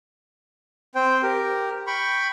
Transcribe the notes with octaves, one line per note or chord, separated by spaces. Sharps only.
C4 C5 G5
G4 A#4
G5 B5 C#6